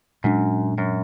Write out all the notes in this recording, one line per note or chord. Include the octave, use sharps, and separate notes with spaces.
F#2 A#2 G#3 D4
F#2